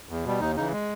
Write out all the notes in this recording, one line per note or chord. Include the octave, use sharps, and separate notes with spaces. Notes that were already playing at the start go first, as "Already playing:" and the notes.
E2
B2 G3
D#2 D#4
C#3 E3 D#4
G#3